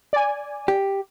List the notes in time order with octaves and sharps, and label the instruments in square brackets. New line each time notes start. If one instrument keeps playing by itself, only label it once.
[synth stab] D5 G#5
[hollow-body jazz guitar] G4